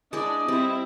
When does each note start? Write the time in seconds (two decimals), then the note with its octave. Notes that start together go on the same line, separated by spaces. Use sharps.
0.13 G#3 D4 E4 D5 D#5
0.48 G3 C4 E4